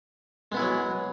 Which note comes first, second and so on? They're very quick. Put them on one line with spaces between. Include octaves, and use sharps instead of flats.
G#3 B3 E4 G#4 F#3